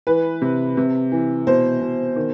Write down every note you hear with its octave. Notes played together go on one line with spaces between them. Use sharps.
E3 B4
C3
C3
E3
B2 C5
B2
D#3